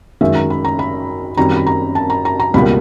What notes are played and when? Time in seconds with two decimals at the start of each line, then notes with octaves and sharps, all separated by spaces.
0.21 F#2 D#3 G#3 E5
0.35 A#5
0.50 B5
0.65 A#5
0.79 B5
1.37 F#2 D#3 G3 C4 A#5
1.57 B5
1.66 A#5
1.95 A5
2.10 A#5
2.25 A#5
2.40 A#5
2.54 C#2 B2 G3 A#3 B5